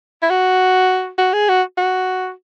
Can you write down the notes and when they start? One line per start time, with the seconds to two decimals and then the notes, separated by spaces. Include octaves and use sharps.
0.22 E4
0.30 F#4
1.18 F#4
1.33 G#4
1.49 F#4
1.78 F#4